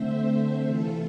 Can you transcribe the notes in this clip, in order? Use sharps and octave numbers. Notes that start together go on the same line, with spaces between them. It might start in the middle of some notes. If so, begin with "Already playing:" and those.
Already playing: D3 A3 C4 C5 E5
C3 E3 A3 F4 A4